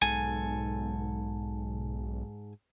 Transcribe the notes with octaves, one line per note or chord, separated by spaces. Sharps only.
B1 G#2 A4 G#5